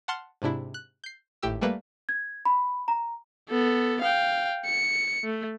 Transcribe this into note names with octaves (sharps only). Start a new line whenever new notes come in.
F#5 A5 C6 F6
G#2 C3 D4 E4
F#6
G6 C7
G#1 A2 G4 E6
G3 A3 A#3 B4
G#6
B5
A#5
B3 A4
F5 G5
C#7
A3